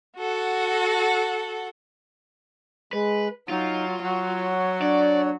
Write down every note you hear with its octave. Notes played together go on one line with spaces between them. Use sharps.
F#4 A4 F#5
G#3 B4
F#3 D#4 F4
F#3 C#5 F#5
D4 D5